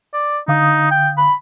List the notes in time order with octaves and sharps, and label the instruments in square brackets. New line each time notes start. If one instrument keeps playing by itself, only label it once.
[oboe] D5
[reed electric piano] D3 F5 D#6 [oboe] D#4
[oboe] G5
B5